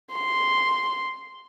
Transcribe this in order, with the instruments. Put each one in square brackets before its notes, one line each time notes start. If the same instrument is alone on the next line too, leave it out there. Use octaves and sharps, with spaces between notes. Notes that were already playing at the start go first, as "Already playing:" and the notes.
[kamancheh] C6